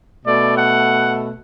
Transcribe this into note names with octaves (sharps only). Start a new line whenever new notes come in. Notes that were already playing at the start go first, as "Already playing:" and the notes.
B2 A3 D5
F#5